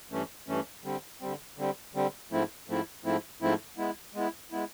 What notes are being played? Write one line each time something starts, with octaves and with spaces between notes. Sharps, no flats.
G2 E3 A3 C#4
G2 E3 A3 C#4
D3 G3 C4
D3 G3 C4
D3 G3 C4
D3 G3 C4
G#2 F3 A3 C4 E4
G#2 F3 A3 C4 E4
G#2 F3 A3 C4 E4
G#2 F3 A3 C4 E4
G#3 B3 E4
G#3 B3 E4
G#3 B3 E4